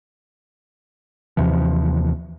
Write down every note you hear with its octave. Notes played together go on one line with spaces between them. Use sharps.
D#2 C3 E3 F3